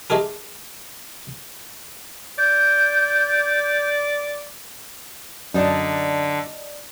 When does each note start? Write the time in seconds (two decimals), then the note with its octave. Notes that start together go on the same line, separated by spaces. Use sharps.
0.10 G#3 A3 D#4 G4 G#4 A#4
2.38 D5 G6
5.54 F#2 D3 D#4 D5 A5